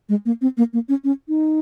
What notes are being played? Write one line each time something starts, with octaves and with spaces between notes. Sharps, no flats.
G#3
A#3
C4
A#3
A#3
C#4
C#4
D#4